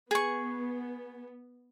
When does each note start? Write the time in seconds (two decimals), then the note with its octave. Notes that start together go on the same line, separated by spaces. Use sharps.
0.11 B3 G#4 C#6